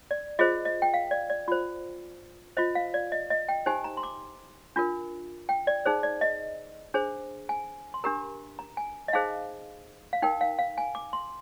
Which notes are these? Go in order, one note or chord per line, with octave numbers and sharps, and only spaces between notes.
D5
F4 G#4 C5 D#5
D#5
G5
F5
D5
D5
F4 C5
F4 C5 D#5
F5
D5
D#5
D#5
G5
D#4 G4 C5 G#5
A#5
C6
D6
D4 F4 A#4
G5
D5
D#4 G#4 C5
D5
D#5
D4 G#4 C5
G#5
C6
D4 G4 A#4 A#5
A#5
G#5
D#5
D#4 G#4 C5 F5
F5
D#4 A#4 G5
F5
F5
G#5
D6
C6